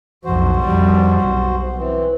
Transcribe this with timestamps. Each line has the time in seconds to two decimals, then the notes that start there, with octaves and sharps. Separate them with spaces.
0.25 B1 F2 F#4 C5
0.60 F2 G3
1.21 B1
1.77 E3 C4